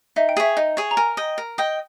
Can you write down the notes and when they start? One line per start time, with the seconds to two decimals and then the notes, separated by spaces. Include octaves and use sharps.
0.16 D#4 E5
0.29 G5
0.37 G#4 C#5 E5
0.57 D#4
0.77 G#4 C#5
0.91 A#5
0.97 A#4 G#5
1.17 D#5 G5
1.38 A#4
1.58 D#5 G5